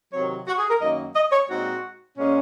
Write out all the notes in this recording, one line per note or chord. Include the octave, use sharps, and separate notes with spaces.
C3 D#3 F#3 C4 C#5
F#4
G#4
A#4
F#2 D#3 A#3 D#4 D#5
D#5
C#5
A#2 G#3 C4 D#4 F#4
A#2 G#3 C#4